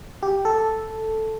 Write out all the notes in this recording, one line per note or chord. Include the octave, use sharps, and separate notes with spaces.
G4
A4